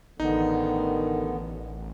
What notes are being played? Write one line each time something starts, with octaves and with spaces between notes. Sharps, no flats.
A1 D3 D#3 B3 D#4